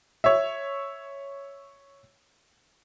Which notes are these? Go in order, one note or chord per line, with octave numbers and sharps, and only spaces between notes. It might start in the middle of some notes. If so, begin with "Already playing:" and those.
C#5 E5